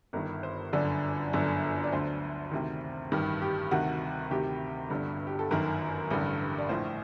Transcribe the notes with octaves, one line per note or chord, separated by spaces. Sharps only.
G1 G2 D#3 A#4
C5
G1 F#2 D3 D5
G1 F#2 D3
D5
D2 D3 C5
D2 C3 D#3
A1 G2 D#3
G4
D2 C3 D#3 F#4
D2 C3 D#3 G4
G1 G2 D3
G4
A4
G1 F#2 D#3 A#4
A1 G2 D3
D5
A#1 A2 C5